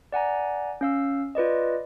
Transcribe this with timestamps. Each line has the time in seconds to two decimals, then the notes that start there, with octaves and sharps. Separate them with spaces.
0.12 D5 F#5 G#5 A#5
0.81 C#4 F5 E6
1.35 F4 B4 D5 D#5